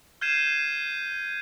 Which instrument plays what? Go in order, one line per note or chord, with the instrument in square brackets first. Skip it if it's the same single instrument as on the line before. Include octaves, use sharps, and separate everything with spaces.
[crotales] F6 G6 G#6 C7 D#7 E7